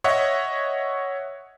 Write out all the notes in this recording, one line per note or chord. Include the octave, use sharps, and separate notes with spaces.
C#5 D#5 E5 F#5